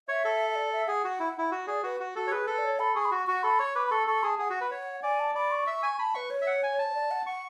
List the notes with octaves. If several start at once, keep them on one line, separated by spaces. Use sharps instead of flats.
C#5 E5
A4
E5
D5
E5
G#4 F#5
F#4
E4
E4
F#4
G#4 D5
F#4 B4
F#4
F#4 A4
C#5
G#4 B4
A4 B4
D5
C#5
A4 B5
G#4 C#6
B5
F#4 C#6
F#4 C#6
A4 B5
C#5 C#6
B4 D6
B5
A4 C#6
A4 C#6
G#4 A5
G#4 F#5
F#4
B4
C#5
D5 G#5
A5
D5 B5
C#6
E5
G#5
A5 B5
B4 C#6
C#5
E5
F#5
G#5
A5
C#5
D5
F#5
F#5 C#6